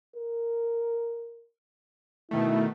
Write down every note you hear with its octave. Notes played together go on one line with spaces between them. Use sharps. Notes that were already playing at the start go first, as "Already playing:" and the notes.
A#4
B2 D#3 A3 E4